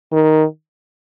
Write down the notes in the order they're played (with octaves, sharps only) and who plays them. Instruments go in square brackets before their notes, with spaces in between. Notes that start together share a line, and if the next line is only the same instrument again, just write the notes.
[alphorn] D#3